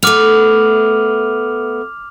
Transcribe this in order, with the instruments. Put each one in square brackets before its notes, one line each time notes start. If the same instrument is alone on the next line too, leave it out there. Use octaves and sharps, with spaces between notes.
[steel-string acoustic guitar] A3 B3 [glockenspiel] D6 F6 F7